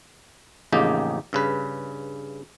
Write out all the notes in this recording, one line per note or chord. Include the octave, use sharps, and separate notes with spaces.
A1 F2 C#3 A#3 D#4 G4
G2 C#3 B4